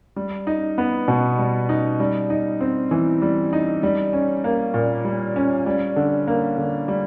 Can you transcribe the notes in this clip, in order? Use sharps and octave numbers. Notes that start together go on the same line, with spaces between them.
G3
D#4
B3
B2
G3
D#4
G3
D#4
C4
E3
G3
D#4
G3
C#4
A#3
A#2
G3
C#4
G3
D3
A#3
D3
G3